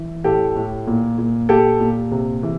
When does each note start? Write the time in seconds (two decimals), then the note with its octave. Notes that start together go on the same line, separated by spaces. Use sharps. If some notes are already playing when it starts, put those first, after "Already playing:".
Already playing: E3
0.24 A2 G4 A4
0.56 A2
0.87 A#2
1.18 A#2
1.49 A#2 G4 A4
1.80 A#2
2.12 C3
2.43 E3